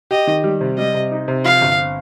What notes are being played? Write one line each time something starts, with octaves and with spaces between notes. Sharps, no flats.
G4 D#5
D#3
G3
C3
G3 D#5
C3
D#4
C3
F3 F5
G1
C4